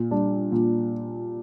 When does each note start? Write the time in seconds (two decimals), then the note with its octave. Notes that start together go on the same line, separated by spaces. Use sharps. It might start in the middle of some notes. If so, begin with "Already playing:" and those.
Already playing: A#2
0.11 G3 D4
0.52 A#2